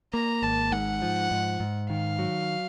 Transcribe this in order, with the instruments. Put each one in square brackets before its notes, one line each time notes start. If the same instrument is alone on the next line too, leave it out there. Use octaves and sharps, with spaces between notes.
[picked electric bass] A#3 [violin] A#5
[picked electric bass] G#1 [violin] A5
[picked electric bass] G#2 [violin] F#5
[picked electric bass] F3
G#2
G#2
[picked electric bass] D#3 [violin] F5
[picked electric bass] F#3